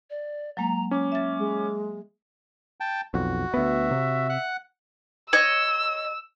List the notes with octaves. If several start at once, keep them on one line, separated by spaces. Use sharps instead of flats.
D5
F#3 G#3 A#3 A#5
C#4 D6
E5 A6
G#3
G5 A5
B1 F2 F#4
D2 B3 E5
C3
F#5 F#6
C#5 D#5 E6